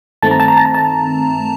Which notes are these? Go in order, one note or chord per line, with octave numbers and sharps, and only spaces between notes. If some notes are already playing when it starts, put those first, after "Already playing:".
G2 D#3 A3 C4 A5
A#5
A5
A#5
A5
A#5
A5